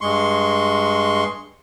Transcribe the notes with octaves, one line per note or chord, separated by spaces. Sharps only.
G2 G#3 C6 C#6